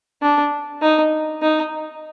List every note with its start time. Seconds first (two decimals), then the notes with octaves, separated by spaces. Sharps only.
0.22 D4
0.82 D#4
1.42 D#4